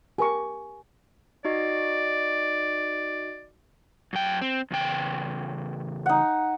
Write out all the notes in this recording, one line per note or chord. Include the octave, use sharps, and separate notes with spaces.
G4 A#4 G#5 C#6
D#4 F#4 D5 D#5
F#2 G5
C4
E2 C#3 G5
D#4 F#5